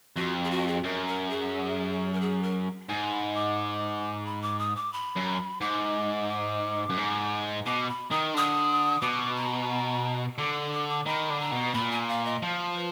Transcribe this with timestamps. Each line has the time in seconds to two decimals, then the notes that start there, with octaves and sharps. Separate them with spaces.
0.16 F2 F#4
0.44 G#4
0.51 F#4
0.68 G#4
0.84 F#2 A#4
1.07 A#4
1.30 G#4
2.13 A#4
2.21 G#4
2.43 A#4
2.89 G#2 G#5
3.12 B5
3.34 D6
4.25 B5
4.42 D6
4.59 D#6
4.76 D6
4.93 B5
5.16 F#2
5.61 G#2 D6
6.29 D6
6.90 F#2
6.98 G#2
7.66 B2 D6
7.88 B5
8.11 D#3 D#6
8.34 D3 D#6
9.02 B2 D6
9.35 A#5
10.38 D3 D6
10.55 D6
10.72 D6
10.89 D6
11.06 D#3 B5
11.30 D3
11.40 A#5
11.52 B2
11.74 A#2 B5
11.91 G#5
12.08 F5
12.26 D#5
12.42 F3
12.76 B4